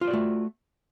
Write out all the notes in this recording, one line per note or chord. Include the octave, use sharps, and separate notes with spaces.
A3 F4 F#4 C5 D5